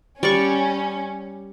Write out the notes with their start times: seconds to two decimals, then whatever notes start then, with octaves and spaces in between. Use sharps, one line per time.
0.23 G3 C#4 D5 C#6